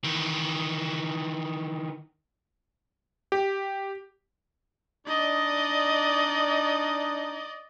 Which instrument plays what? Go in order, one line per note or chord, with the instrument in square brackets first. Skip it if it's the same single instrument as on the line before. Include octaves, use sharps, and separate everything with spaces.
[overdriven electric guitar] D#3 E3
[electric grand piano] G4
[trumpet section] D4 D#4 [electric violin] D5 D#5